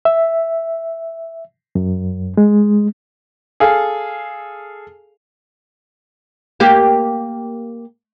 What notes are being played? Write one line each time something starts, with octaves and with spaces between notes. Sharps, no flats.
E5
F#2
G#3
G#4 A4 F5
A#3 G4